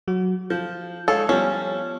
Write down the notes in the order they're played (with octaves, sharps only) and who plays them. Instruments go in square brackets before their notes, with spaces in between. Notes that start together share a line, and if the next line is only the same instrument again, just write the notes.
[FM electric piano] F#3 F#4
[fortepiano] F3 [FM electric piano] G6
[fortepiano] G#3 C#5 F5 [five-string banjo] A4
[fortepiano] F3 G3 [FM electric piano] B3 [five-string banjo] C#4